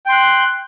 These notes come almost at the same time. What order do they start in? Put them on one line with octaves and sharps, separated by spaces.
G5 C6 F#6